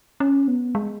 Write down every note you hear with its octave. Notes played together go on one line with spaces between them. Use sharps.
C#4
B3
G#3